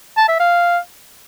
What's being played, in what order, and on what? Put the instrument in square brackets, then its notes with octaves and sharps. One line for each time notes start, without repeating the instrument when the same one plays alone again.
[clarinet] A5
E5
F5